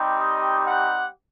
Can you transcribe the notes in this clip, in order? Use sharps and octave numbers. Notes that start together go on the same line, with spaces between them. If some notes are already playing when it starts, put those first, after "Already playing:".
Already playing: G3 C4 D#4 G4
D#5
F#5